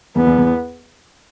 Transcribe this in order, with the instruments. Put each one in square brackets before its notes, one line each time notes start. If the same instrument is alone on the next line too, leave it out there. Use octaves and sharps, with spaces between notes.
[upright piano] E2 [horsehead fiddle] B3
[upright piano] E2
E2